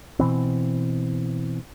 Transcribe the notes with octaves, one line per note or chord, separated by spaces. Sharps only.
B2 E3 C4